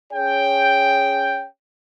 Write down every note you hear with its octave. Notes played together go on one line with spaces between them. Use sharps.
C#4 G#4 C#5 G5